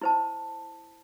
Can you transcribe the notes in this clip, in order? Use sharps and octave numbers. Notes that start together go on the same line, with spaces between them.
E4 C5 A5